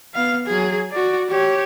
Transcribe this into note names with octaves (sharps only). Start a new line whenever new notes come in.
B3 F5
F#3 G#4
F#4 D5
G4 C#5